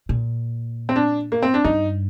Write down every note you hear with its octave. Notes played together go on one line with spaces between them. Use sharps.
A#2
C4
D4
A#3
C4
D4
G2 D#4